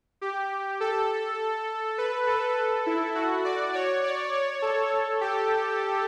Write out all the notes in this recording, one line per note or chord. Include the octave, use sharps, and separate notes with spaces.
G4
A4
B4
A4
E4
F#4
D5
C#5
D5
C#5
A4
G4